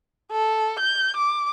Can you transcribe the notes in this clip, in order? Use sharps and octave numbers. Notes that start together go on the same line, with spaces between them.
A4
G6
D6